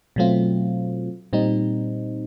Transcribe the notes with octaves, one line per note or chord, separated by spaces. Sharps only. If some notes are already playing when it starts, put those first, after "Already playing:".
B2 F#3 A3 C4 F4
A#2 G3 C4 D#4